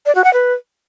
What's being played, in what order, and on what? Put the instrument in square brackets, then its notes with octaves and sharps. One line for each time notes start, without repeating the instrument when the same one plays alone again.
[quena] D5
F#4
F#5
B4